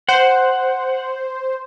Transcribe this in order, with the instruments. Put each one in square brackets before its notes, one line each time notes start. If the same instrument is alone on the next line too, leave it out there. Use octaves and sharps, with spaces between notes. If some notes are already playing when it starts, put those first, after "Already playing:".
[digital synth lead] C5 [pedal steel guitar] F#5